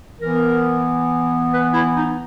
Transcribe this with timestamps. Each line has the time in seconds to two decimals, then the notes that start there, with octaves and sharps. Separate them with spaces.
0.19 E3 B3 A#4
1.52 B4
1.73 E4
1.95 D#4